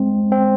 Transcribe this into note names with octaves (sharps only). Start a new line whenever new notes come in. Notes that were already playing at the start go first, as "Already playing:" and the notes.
Already playing: G#3 C4
C4